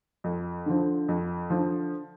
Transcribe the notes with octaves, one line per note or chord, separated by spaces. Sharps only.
F2
D3 F3
F2
D3 F3